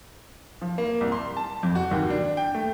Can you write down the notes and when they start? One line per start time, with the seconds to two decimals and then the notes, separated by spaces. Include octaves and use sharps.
0.61 F3
0.78 A#3
1.01 C2
1.12 C6
1.37 A5
1.63 F2
1.75 F#4
1.91 D#2
2.10 D4
2.37 G5
2.55 A3